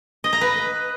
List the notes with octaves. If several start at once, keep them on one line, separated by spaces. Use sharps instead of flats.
D#5
A#5
B4